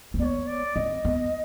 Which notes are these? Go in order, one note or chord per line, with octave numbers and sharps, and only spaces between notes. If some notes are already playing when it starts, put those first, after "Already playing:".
C4
B3 D5
C#5
D5
C4 D#5
B3